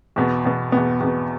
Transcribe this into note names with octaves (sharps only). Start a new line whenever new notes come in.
E2 B2 B3
E2 B2 B3
E2 B2 B3
E2 B2 B3